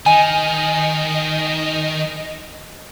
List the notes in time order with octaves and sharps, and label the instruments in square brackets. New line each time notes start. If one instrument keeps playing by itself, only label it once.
[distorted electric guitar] D#3 [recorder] D#5 [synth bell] G#5